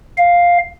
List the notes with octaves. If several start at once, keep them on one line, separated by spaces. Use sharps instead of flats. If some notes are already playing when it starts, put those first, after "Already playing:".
F5